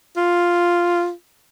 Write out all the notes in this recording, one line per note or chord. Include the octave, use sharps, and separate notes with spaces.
F4